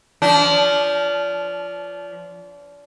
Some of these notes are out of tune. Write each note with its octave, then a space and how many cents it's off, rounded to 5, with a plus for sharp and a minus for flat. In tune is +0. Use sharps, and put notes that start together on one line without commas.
F3 -10 D4 -35